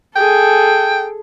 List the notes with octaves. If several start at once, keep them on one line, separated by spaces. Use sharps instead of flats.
G#4 A4 G5